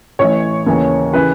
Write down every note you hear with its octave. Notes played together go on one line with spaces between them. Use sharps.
A1 A2 E3 C#5
D#2 C#3 E3
C#3 E3 B4